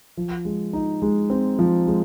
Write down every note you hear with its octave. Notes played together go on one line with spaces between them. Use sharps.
F3
G#3
D#4
G#3
C4
F3
G#3